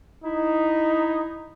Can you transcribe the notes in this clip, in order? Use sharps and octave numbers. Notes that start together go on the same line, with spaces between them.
D#4 E4